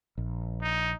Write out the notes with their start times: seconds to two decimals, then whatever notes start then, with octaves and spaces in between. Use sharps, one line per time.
0.18 A#1
0.62 D#4